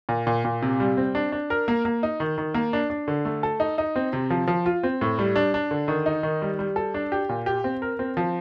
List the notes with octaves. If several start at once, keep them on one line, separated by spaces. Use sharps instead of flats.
A#2
A#2
A#2
C3
G3
C4
D4
D4
A#4
A#3
A#3
D#4
D#3
D#3
A#3
D4
D4
D3
A3
A4
D#4
D#4
C4
C3
F3
F3
F4
C4
A2
G3
D4
D4
D3
D#3
D#4
D#3
G3
G3
A4
D4
G4
A#2
G4
C4
A#4
C4
F3